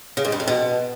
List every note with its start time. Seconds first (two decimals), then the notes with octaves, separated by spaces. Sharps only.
0.17 C#3
0.25 G#2
0.32 G2
0.40 F2
0.47 B2